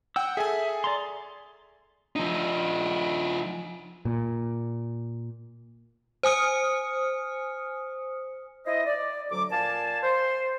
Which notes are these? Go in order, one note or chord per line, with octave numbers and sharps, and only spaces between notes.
F#5 G5 E6
G#4 A4 E5 G#5
D5 A#5 C6
F3 D#4
A#2
C5 G#5 D#6 F6 C#7
E4 C5 D#5
D5
D2 F#3 D6
A#2 F5 G#5 A5
C5